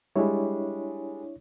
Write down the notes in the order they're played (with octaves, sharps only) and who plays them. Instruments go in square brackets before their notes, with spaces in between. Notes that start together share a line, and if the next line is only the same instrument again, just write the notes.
[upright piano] G3 G#3 [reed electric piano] D4 E4 C#5